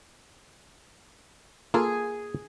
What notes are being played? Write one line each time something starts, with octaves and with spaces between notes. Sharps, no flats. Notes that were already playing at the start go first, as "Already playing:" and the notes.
A#3 F4 G#4 A4